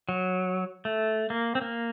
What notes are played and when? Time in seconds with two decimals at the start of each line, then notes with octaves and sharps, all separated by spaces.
0.09 F#3
0.85 A3
1.30 A#3
1.55 C4
1.62 A#3